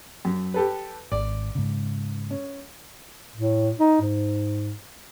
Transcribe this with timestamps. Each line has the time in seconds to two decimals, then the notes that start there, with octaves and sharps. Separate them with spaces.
0.25 F#2
0.54 G4 A4 B4
1.12 G#1 D5
1.55 G#2 C#3
2.30 C#4
3.36 A2
3.80 D#4
4.01 G#2